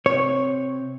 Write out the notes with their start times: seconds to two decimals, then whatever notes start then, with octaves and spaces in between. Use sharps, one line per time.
0.06 C3 C4 C#5